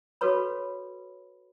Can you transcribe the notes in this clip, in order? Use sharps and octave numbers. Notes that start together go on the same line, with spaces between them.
F#4 A4 B4 C#5 B5